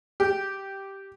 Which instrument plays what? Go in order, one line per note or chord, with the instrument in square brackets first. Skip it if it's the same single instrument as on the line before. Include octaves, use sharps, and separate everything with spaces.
[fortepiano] G4